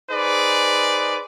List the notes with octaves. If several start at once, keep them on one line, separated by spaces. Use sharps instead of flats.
D#4 G#4 B4 C5 D5